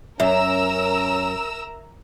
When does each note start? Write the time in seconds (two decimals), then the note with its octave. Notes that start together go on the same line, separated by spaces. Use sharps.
0.20 F#2 C#4 A#4 E5 A#5 E6